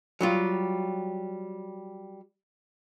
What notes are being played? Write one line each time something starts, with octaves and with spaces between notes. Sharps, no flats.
F#3 G3 F4